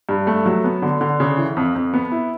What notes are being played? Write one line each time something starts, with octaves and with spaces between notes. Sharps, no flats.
G2
A3
F#3
B3
D3
D3
C#3
E3
F2
F2
B3
E4